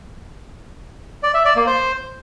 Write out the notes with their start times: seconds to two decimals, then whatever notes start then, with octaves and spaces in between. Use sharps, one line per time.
1.23 D5
1.34 E5
1.45 D5
1.56 A#3
1.67 C5